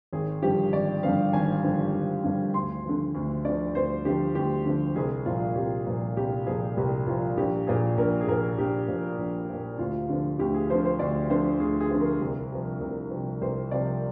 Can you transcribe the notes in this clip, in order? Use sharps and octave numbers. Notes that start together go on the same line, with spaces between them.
G#1 G#4
G2 D3 F3 G4
G#1 D5
G2 D3 F3 F5
G#1 G#5
G2 D3 F3
G#1
G2 D3 F3
D2 C6
D3 F3
D2
D3 F3 D5
D2 C5
D3 F3 G4
D2 G4
D3 F3
C2 G#4
A#2 F3 F4
C2 G4
A#2 F3
C2 G4
A#2 F3 G#4
C2 G4
A#2 F3 F4
A#1 G4
A#2 F3 G#4
A#1 A#4
G#4
A#2 F3 A#4
A#1 G4
A#2 F3
A#1
A#2 F3
D2 F4
D3 F3
D2 G4
G#4
D3 F3 C5
C5
D2 D5
D3 F3 C5
D2 G#4
G#4
D3 F3
A#4
C2
C3 F3
C2
C3 F3
C2 C5
C3 F3 D5